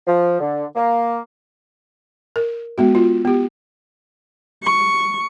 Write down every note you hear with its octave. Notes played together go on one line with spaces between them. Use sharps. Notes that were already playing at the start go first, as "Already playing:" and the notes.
F3
D3
A#3
A#4
G#3 B3 F#4
F4
B3 G4
C#6